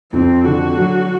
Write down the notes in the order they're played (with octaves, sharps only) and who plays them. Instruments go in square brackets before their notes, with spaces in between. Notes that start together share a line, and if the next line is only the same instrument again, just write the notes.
[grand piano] F2 [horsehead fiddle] C4
[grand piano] D3 [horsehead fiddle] F#4
[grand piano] F#3